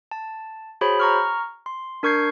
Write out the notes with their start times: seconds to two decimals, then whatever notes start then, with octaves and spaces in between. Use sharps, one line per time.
0.11 A5
0.81 F#4 G#4 C5 C#5 B5
1.00 A#5 C#6 F6
1.66 C6
2.03 D4 A#4 C#6 G6 G#6 C7